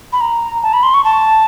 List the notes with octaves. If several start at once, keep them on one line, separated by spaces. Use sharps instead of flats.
B5
A#5
A5
B5
C6
C#6
A5